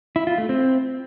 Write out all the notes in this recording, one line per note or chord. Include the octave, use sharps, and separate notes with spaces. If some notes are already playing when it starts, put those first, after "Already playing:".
E4
F4
A3
C4